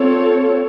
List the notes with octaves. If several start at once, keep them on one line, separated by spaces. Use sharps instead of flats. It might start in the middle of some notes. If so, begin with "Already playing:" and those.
Already playing: C4 F4 A4 C#5